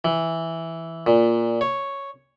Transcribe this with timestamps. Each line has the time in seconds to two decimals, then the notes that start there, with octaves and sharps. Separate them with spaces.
0.05 E3
1.07 A#2
1.61 C#5